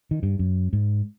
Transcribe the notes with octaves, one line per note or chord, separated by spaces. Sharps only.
D#3
G2
F#2
G#2